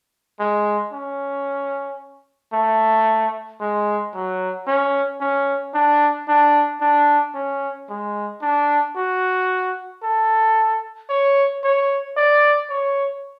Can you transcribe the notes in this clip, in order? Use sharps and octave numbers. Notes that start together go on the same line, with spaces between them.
G#3
C#4
A3
G#3
F#3
C#4
C#4
D4
D4
D4
C#4
G#3
D4
F#4
A4
C#5
C#5
D5
C#5